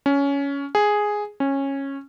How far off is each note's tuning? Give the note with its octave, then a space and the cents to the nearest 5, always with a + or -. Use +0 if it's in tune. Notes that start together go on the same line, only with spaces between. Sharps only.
C#4 +15
G#4 +0
C#4 -15